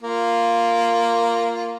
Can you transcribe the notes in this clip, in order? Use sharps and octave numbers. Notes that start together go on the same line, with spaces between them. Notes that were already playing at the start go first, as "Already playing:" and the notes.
A#3 F4